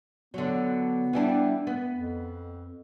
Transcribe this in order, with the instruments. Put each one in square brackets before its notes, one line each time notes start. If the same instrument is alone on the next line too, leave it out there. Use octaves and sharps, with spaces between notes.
[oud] D3 F#3 [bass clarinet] B3
[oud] E3 G3 D4
B3
[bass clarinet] F2